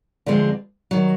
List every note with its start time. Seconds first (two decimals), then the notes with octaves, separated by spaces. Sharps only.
0.26 D2 D3 F3 G#3 C4
0.91 D#3 F#3